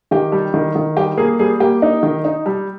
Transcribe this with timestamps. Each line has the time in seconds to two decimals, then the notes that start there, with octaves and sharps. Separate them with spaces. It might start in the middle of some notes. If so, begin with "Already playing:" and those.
0.11 D#3 G4
0.32 G3
0.54 D#3
0.76 D#3
0.97 G3 G4
1.18 A#3 G#4
1.39 G3 G#4
1.60 A#3 G4
1.82 D#4
2.03 D#3
2.24 D#4
2.46 G3